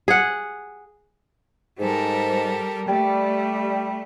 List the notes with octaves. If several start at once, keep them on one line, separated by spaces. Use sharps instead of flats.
G#4 F#5
G#2 G3 A4 A#4
G3 A3